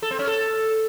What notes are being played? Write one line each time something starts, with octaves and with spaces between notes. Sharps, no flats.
A4
C4
C#4
A4